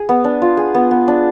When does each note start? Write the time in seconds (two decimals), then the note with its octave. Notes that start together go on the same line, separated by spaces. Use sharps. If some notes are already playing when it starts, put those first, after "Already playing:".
Already playing: G#4
0.09 B3
0.24 D4
0.42 F4
0.57 G#4
0.74 B3
0.91 B3
1.08 D4